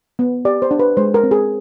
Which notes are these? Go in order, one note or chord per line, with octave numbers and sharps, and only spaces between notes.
B3
G4 D5
C5
D4
B4
G#3 C5
A#4
C4
G#4